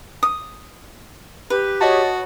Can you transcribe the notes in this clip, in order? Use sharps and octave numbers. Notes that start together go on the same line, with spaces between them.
D#6
G4 B4
F#4 C#5 D#5 A5